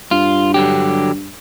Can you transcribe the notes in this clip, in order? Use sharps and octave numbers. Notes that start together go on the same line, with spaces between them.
G2 F4
D3 F#3 G4